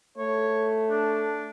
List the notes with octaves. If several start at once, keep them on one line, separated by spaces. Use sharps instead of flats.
A3 C#5
D4